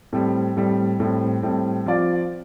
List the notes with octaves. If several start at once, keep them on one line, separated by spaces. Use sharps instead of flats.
A2 G3 C4
A2 G3 C4
A2 G3 C4
A2 G3 C4
F3 C4 F4 D5